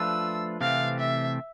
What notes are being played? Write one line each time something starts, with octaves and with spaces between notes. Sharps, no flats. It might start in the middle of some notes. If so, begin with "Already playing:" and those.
Already playing: F3 A3 D4 F4 B4 E6
C3 E3 A3 C4 G4 F5
E5